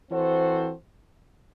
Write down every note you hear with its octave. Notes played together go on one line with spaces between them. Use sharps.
E3 C4 F#4 A4 C5